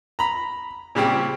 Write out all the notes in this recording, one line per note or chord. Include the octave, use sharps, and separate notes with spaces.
A#5 B5
A#2 C#3 G3 C4 G4